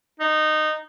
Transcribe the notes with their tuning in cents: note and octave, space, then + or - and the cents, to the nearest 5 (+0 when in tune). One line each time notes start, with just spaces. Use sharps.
D#4 -15